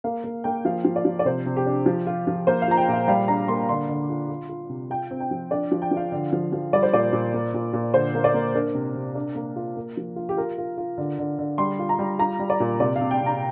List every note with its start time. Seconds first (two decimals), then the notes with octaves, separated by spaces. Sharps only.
0.04 A#3 F5
0.24 A#3
0.44 A#3 G5
0.65 F3 F5
0.85 F3
0.96 D5
1.05 F3
1.19 D5
1.25 C3 C5
1.46 C3
1.56 G4
1.66 D4
1.86 F3
2.07 F4
2.27 F3
2.47 A#3 C5
2.62 F5
2.68 F4 A#5
2.77 G5
2.88 A#2 F5
3.08 G3 F5
3.28 D4 A#5
3.48 A#3 C6
3.69 D3 C6
3.89 D3
4.10 F4
4.29 F4
4.49 F4
4.69 C3
4.90 F4 G5
5.11 C4
5.20 G5
5.31 F3
5.51 D4 D5
5.72 F3
5.82 G5
5.91 F3
5.97 F5
6.12 D3
6.33 F3
6.52 F3
6.73 G3 D5
6.83 C5
6.93 A#2 D5
7.13 A#2
7.34 A#3
7.54 A#2
7.73 A#2
7.94 D3 C5
8.15 A#3
8.24 D5
8.34 A#3
8.55 D4 A#4
8.75 C3
8.95 C3
9.15 D4
9.35 A#3
9.56 F4
9.77 A#3
9.97 F3
10.16 F4
10.29 G4
10.37 F4 A#4
10.58 F4
10.77 F4
10.98 D3
11.18 D3
11.39 D3
11.58 G3 C6
11.79 F4
11.89 A#5
11.99 G3
12.19 F4 A#5
12.39 G3
12.50 D5
12.60 A#2
12.80 C3 D5
12.96 F5
13.01 C3
13.11 G5
13.21 C3
13.26 A#5